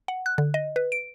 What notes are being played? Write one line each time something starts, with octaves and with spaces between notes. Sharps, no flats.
F#5
F#6
D3
D#5
B4
D7